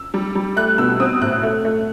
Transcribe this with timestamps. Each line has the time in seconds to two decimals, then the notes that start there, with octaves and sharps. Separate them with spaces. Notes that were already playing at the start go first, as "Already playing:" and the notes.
Already playing: E6
0.14 G3
0.35 G3
0.57 A3 F#6
0.78 B2 E6
1.00 C4 D#6
1.21 A2 F#6
1.43 A3
1.65 A3